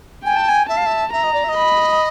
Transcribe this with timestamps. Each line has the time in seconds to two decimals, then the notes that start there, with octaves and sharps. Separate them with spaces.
0.24 G5 G#5
0.36 A5
0.48 G#5
0.68 E5 A5
0.77 F5
0.85 E5
1.12 E5 A#5
1.23 D#5
1.33 D5
1.44 E5
1.48 D#5
1.57 B5